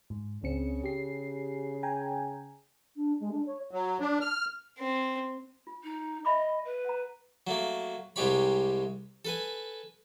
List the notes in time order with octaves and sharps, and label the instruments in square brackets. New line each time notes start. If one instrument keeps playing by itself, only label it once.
[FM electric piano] G#2
[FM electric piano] C#2 C4 C#7 [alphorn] C#3
[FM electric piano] G4 C7
G5 G#5 A#5
[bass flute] D4
G#3
D4
C#5
[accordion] F#3
D4
F6
[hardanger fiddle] C4
[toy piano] F4
[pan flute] D#4
[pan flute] D#5 [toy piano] E5 B5 D6
[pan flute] B4
[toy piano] F#5 A#5
[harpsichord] F#3 A3 A#3
C2 C3 G#3 G4 C#5 B5
A4 B4 G#5